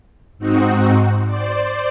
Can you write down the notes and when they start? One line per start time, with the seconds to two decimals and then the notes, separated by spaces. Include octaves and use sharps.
0.38 G#2 C4 D#4 F#4
1.26 C5 D5